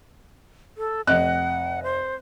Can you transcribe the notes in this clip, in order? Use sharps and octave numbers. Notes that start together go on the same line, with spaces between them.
A4
F1 D#5 F#5 F#6
C5